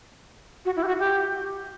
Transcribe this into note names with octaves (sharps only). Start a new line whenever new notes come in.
F#4
E4
G4
F#4
G4